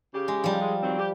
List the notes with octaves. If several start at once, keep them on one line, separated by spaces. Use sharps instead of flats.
C#3 G4
G#3
F3 G3
G#3
D#3 F#3 C4
G4